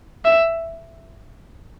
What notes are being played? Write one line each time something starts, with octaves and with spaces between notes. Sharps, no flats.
E5